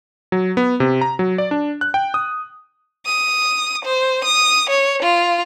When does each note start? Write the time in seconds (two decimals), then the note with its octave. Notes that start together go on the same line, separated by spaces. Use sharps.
0.32 F#3
0.57 B3
0.80 C3
1.01 A#5
1.19 F#3
1.38 D5
1.51 D4
1.81 F#6
1.94 G5
2.14 D#6
3.06 D#6
3.85 C5
4.24 D#6
4.69 C#5
5.03 F4